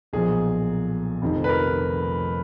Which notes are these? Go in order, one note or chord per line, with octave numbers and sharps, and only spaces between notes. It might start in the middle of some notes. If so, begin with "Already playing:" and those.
B1 A#2 F3 G#4
F1 F2 D#3
B4
A#4